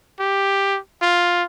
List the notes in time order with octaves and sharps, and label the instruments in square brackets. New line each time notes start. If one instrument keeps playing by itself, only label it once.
[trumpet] G4
F4